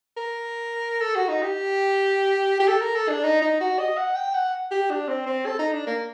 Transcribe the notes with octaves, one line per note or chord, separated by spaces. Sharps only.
A#4
A4
F#4
D#4
G4
G4
A4
A#4
A4
D4
D#4
D#4
F#4
D#5
F#5
G5
F#5
G4
D4
C4
C4
A4
D#4
D4
A#3